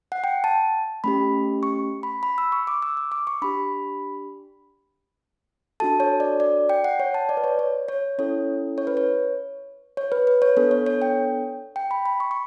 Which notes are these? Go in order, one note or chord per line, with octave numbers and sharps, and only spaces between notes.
F#5
G5
A5
A3 C#4 G4 B5
C#6
B5
B5
E6
C#6
D6
E6
D6
D6
C#6
D4 G4 B5
D4 F#4 A4 A5
C#5
D5
D5
G5
F#5
C#5
A5
D5
B4
C#5
C#5
C#5
C#4 E4 A4 C#5
C#5
B4
C#5
C#5
B4
B4
C#5
B3 D4 A4 C#5
C#5
C#5
G5
G5
B5
B5
C#6
C#6